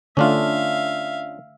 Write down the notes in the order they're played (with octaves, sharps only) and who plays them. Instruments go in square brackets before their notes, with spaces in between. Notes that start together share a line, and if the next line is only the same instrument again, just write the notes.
[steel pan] D3 A3 [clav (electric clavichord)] C#4 D4 F4 [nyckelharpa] E5 F5